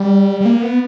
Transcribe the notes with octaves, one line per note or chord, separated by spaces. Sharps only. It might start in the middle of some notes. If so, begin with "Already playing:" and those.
Already playing: G3
G3
A#3
B3